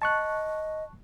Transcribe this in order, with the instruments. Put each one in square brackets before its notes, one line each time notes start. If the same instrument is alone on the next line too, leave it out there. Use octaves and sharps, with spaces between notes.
[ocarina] D#5 [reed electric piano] A5 C#6 F#6